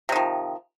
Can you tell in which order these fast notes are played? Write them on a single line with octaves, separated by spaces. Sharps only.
C3 D#3 F3